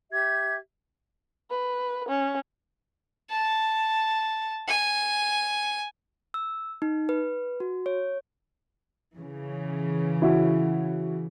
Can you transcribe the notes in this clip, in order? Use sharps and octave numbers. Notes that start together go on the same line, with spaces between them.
G4 E5 G#6
B4
C#4
A5
G#5
E6
D#4
B4
F#4
C#5
C#3 E3
E4 F#4